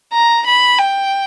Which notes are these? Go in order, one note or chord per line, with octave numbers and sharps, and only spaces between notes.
A#5
B5
G5